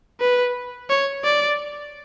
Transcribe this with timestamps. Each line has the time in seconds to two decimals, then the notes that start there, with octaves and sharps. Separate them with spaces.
0.20 B4
0.90 C#5
1.24 D5